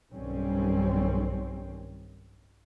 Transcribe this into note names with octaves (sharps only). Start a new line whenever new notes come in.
B1 G2 D#3 G3 C4 C#4